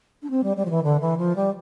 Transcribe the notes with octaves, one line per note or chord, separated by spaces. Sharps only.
D4
C4
G3
G3
F3
E3
D3
E3
F3
G3